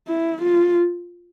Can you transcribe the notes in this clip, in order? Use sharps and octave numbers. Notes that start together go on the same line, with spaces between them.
E4
F4